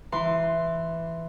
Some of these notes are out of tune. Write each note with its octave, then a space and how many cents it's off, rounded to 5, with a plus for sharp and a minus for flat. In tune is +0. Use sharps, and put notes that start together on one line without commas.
E3 +5 C6 +0